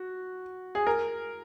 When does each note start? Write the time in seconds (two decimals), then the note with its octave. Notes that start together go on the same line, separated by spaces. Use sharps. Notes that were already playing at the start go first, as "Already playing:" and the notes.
Already playing: F#4
0.75 G#4
0.87 A#4